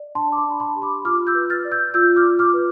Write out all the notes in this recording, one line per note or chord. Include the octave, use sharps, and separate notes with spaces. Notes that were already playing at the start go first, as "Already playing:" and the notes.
Already playing: D5
D4 A5 C6
D6
A5 C6
D4
B5
A5 C6
G4
B5 D6
F4 D6 F6
E6 G6
B4
F6 A6
D5
E6 G6
F4 E6 G6
D6 F6
F4
D6 F6
B4